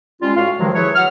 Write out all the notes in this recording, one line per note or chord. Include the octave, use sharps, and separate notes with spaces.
G3 G#3 C#4 F4
A2 F#4 F5
G2 D#3 F3 F#3 G#3
E4 G#4 B4 C#5
F#3 F#5 F6